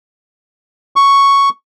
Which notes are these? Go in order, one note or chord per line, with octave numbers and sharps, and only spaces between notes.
C#6